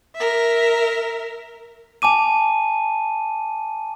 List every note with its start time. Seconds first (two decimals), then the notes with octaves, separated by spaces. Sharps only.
0.15 A#4 E5
2.02 G#5 A5 D6 D#7